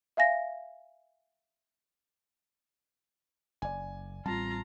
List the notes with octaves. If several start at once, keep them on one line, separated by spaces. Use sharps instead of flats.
E5 F5 G#5 A#6
F#1 D5 G#5
A1 G3 C4 F4 A5 A#5